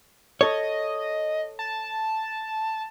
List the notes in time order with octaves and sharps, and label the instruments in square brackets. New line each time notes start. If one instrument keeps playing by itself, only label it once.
[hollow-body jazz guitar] A4 C#5 [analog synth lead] D#5
[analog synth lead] A5